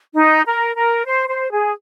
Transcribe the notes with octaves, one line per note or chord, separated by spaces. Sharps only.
D#4
A#4
A#4
C5
C5
G#4